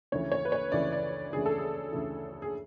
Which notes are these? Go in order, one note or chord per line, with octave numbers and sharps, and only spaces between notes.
D2 C#3 E3 C#5
C#5
B4
C#5
D2 C#3 E3 D5
D5
D2 C#3 E3 G#4
A4
G#4
D2 C#3 E3
G#4